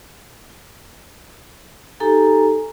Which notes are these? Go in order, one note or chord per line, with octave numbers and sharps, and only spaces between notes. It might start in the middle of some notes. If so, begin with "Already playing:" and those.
D#4 G4 A4 G#5 A#5